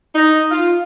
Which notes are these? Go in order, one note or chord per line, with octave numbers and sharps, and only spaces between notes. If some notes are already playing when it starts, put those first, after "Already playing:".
D#4
F4